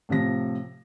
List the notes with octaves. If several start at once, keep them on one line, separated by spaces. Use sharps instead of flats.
A2 C3 F3 A#6